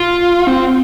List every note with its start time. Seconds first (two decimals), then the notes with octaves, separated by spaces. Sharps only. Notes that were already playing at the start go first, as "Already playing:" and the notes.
Already playing: F4
0.47 C4